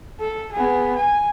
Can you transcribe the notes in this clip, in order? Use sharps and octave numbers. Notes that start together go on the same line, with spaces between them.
A4
B3 G#4
G#5